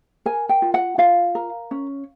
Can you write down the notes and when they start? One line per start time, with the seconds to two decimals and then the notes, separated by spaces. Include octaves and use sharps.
0.26 A#4 G#5
0.49 G5
0.62 F4
0.74 F#5
0.98 F4 F5
1.35 A#4
1.71 C#4